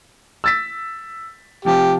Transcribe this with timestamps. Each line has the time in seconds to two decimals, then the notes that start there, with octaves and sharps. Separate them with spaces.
0.44 E6 A6 B6
1.65 C3 F3 G4